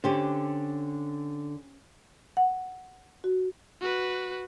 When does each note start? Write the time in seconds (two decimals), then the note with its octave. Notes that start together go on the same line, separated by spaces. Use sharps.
0.04 D3 C#4 G4 C5
2.37 F#5
3.24 F#4
3.81 F#4 B4